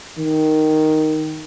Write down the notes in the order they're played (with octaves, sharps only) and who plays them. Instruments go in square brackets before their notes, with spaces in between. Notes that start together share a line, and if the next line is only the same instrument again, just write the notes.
[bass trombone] D#3